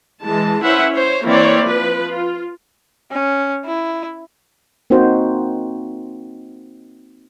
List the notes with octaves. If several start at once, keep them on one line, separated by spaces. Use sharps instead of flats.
E3 G#3 A5
C#4 E4 B4 C5 E5 F#5
C5 C#5
E3 A#3 C4 E4 C#5 D5
F3 B4
F4
C#4
E4
A#3 C4 D#4 F#4 C5